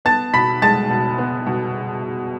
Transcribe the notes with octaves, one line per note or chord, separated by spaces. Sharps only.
B3 A5 A6
B2 B5 B6
G#3 A5 A6
B2
B3
B2